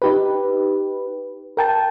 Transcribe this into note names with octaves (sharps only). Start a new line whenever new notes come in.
D#4 G4 B4
A#4 G5 A5